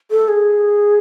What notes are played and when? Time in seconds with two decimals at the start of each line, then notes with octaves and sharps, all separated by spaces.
0.11 A4
0.28 G#4